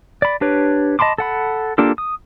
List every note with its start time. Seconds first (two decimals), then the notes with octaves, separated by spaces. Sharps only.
0.22 D5 B5
0.41 D4 G4 B4 C#5
0.99 D#5 A5 B5 C6 D6
1.18 A4 F#5 B5
1.78 A#3 D4 F4 G4 A4
1.98 D#6